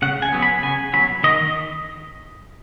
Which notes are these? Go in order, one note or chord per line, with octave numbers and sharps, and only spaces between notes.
C#3 F#5
G#5
F#3 B3
B5
C#3 G#5
F#3 B3 B5
D#3 D#5